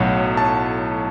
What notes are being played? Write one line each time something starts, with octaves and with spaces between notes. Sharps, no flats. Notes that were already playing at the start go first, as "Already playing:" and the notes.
Already playing: B1 A2 F#3 F#5
A5